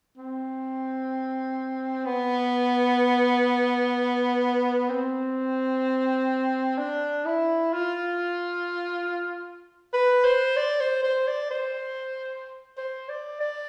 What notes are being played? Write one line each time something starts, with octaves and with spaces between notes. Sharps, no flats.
C4
B3
C4
D4
E4
F4
B4
C5
D5
C5
C5
D5
C5
C5
D5
D5